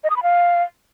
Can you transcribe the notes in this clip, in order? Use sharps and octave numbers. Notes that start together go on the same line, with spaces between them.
D#5
D#6
B5
F5